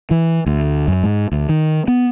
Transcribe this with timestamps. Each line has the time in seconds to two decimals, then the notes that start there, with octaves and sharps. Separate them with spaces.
0.11 E3
0.46 D2
0.88 F#2
1.04 G#2
1.32 D2
1.49 D#3
1.88 B3